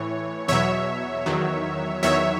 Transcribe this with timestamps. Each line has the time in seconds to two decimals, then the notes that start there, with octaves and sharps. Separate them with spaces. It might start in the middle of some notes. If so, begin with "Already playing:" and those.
Already playing: A2 E3 C#5
0.48 E2 B2 F#3 C#5 E5
1.26 E2 D#3 F#3
2.03 E2 D#3 F#3 C#5 E5